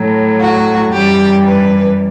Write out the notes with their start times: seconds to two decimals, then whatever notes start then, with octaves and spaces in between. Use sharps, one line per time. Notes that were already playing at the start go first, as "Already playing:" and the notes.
Already playing: A2 F#3
0.40 F#4
0.92 F#2 E3 G3 G4
1.43 B4